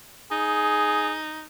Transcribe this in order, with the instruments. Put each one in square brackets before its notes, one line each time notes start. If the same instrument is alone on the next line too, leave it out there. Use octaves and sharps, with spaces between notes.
[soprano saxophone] D#4 [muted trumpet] G#4